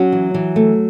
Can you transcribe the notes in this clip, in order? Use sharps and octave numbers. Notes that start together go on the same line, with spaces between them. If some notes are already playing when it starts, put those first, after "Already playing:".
Already playing: F#3 C#4 F#4
E3
E3
A3